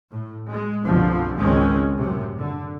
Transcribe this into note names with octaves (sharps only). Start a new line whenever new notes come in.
A2
G#3
G1 C2 B2 D3 F3
G#1 C#2 D#3 G#3 C4 C#4
F#2 A2 C3
D3